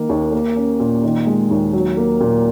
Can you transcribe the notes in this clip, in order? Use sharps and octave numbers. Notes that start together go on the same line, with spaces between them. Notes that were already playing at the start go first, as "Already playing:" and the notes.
Already playing: D#3 A#3
D#2
A#3
C#4
A#2
D#3
G#3
D#2
F#3
A#3
A#2